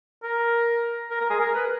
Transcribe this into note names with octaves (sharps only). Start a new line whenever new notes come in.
A#4
A#4
A#4
G#4
A#4
B4